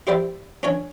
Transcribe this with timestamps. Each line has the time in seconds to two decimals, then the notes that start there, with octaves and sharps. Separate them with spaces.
0.07 E4 G4 C5 D5 E5
0.63 C#4 D4 C#5 G#5